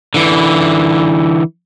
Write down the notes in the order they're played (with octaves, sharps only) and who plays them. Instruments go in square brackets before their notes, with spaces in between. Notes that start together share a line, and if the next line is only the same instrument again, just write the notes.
[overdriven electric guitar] D3 E3